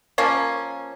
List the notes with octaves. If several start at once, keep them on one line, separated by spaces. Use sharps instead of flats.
F3 A#3 C#4